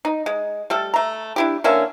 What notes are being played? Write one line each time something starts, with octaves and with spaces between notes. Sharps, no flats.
D#4
G#3
G3 A3 A4
A3 A#5
D4 E4 G4
D3 A#3 C#4 E5